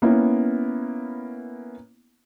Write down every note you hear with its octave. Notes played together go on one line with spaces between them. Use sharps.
A#3 B3 C#4 E4